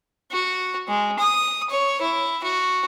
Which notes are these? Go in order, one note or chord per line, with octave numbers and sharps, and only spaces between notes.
F#4
G#3
D#6
C#5
E4
F#4